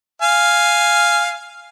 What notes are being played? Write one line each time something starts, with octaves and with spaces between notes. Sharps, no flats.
F5 G#5